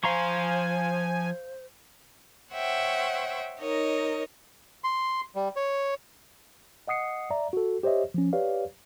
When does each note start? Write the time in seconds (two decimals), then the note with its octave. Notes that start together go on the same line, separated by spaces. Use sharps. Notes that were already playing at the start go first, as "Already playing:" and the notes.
0.04 F3 C5 F5 G#5 A#5 C6 C#6
2.53 C5 C#5 E5 F#5 G5
3.60 D#4 A#4 C#5 D#5
4.84 C6
5.35 G3
5.56 C#5
6.88 D#5 F#5 D#6 C7 C#7
7.30 D5 E5 A#5
7.53 F#4 A4
7.83 G4 C5 C#5 D#5 E5
8.14 F3 C#4
8.33 G4 B4 C#5 D5 F5